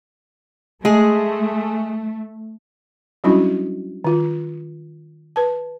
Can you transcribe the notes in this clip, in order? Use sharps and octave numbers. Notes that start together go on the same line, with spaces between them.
G#3 A3 G#4
F#3 G3 C#4 D4 E4 F#4
D#3 F4
B4 A5